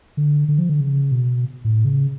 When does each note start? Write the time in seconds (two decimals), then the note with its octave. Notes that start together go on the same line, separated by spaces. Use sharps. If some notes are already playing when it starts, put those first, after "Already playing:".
0.17 D3
0.48 D3
0.59 F3
0.69 D3
0.80 C#3
1.12 B2
1.65 A2
1.85 C#3